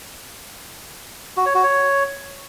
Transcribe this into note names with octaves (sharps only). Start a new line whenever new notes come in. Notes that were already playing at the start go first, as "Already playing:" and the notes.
F#4
C#5
F#4
C#5